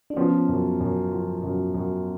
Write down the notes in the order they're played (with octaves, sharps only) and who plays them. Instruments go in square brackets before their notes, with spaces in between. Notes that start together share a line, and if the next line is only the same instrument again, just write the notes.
[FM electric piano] D4
[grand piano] F3 [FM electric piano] B3 C#4
[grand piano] F#2
F#2
F3
F#2
F#2